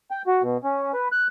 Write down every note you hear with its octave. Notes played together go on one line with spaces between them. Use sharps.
G5
F#4
B2
C#4
B4
F#6